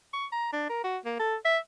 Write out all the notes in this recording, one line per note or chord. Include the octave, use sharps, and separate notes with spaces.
C#6
A#5
D4
A#4
F#4
A#3
A4
E5